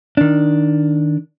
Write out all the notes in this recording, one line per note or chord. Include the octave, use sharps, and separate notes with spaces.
D#3 D4